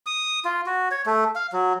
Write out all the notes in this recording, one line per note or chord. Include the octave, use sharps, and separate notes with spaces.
D#6
F4
F#4
C#5
A3
F5
F#3